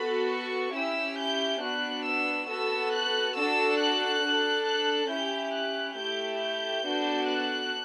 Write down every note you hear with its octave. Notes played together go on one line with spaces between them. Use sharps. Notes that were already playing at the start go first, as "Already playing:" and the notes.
Already playing: B3 F#4 A4 B5
C#6
C#4 E4 G4 E6
G6
B3 D4 F#4 F#6
E6
B3 F#4 A4 E6
F#6
D4 F#4 A4 E6
F#6
D4 A4
F#6
C#4 E4 G4 G6
F#6
A3 E4 G4 G6
G6
B3 D4 F#4 A4
F#6